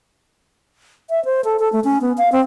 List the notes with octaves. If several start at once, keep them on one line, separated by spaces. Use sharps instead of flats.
E5
C5
A4
A4
A3
C#4
B3
F5
C4